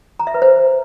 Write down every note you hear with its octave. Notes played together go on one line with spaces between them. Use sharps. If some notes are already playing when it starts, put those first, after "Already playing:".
A#5
E5
B4
C5